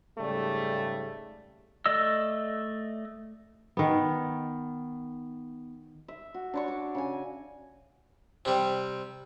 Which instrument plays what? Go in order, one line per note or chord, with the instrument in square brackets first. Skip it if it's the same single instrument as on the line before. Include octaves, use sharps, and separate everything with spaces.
[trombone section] G#2 C#3 G3 A3
[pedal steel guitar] A3 D5 D#5 E6
[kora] D#3 B3
[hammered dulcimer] E5
F#4
D4 C#5 C#6
D6
C#3 C#5 G#5
[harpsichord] C3 G3